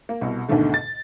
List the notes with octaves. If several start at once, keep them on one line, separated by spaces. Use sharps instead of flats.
A#3
C2 B2
D2 G#2 B2 D3 D#3 A3
A6